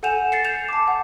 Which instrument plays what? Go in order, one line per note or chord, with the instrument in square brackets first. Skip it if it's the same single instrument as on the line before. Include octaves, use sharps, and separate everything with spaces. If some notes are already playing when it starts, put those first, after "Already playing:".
[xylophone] A4 F#5 G#5 G6 E7 F7
A6 C7 C#7
G6 E7 F7
A5 D6
F#5